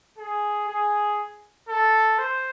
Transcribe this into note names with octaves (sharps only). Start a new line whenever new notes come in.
G#4
G#4
A4
C5